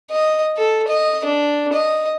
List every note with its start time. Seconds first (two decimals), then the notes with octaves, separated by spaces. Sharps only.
0.11 D#5
0.57 A4
0.88 D#5
1.25 D4
1.73 D#5